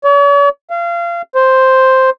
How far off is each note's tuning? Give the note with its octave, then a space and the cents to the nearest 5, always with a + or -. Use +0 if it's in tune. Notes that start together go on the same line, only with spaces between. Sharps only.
C#5 +45
F5 -30
C5 +0